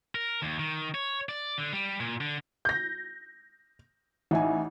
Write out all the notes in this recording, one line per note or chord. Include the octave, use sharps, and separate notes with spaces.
A#4
D#2
D#3
C#5
D5
D3
G3
A#2
D3
G6 A#6
A1 D#4 E5 G#5